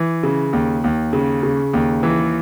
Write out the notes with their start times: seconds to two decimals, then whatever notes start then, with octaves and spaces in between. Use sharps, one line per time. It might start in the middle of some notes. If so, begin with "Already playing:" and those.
Already playing: E3
0.23 C#3
0.53 D#2
0.84 D#2
1.13 C#3
1.43 C#3
1.73 D#2
2.03 E3